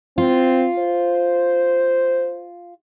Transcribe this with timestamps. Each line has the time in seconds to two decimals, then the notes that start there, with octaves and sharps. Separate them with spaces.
0.18 C4 F4
0.79 C5